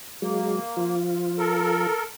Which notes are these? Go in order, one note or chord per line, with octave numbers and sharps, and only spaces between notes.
F#3 G#3 A#3
F3 F4
A4 A#4